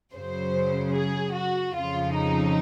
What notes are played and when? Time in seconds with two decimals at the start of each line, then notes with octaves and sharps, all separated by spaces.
0.13 F#2 C#3 F#3 C5
0.94 G#4
1.34 F#4
1.74 F2 C#3 F3 F4
2.14 D#4